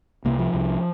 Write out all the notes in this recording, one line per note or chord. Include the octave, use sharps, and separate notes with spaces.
C2 C3 A#3
F3
C2 C3